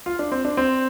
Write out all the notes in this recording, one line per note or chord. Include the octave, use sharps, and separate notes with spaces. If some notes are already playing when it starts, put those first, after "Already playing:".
F4
D4
C4
D4
C4